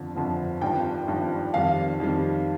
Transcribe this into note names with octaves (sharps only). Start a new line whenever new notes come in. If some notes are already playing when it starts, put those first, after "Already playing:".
Already playing: G1 F2 D3 F3
G1 F2 D3 F3
G#1 G2 F3 G5
G#1 G2 F3
F2 D#3 G3 F5
F2 D#3 G3